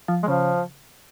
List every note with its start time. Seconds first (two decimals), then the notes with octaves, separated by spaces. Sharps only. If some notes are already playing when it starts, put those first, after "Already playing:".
0.08 F3
0.23 G#3
0.27 C#3 F3